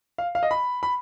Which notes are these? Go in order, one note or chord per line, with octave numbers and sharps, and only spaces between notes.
F5
F5
D#5
B5
B5